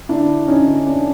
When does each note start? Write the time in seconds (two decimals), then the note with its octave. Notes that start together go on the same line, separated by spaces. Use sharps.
0.09 D3 D4 E4
0.28 D3
0.48 D3 C#4 D#4
0.67 D3
0.86 C4 D4